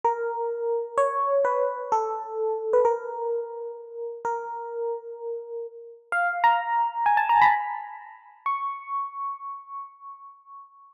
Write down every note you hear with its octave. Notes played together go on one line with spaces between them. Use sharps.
A#4
C#5
B4
A4
B4
A#4
A#4
F5
A#5
G#5
A5
A#5
B5
C#6